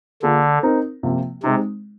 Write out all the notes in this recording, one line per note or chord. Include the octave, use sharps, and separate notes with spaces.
D3 A#3 F4 G#4
C4 D#4 A#4
C3 F3 A#3 F4
C3 G#3 C4 D#4